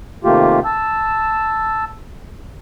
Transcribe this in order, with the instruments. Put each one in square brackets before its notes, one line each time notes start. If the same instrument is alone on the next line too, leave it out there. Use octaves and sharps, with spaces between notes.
[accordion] C3 D#3 A3 A#3 F4 G4
A5 E6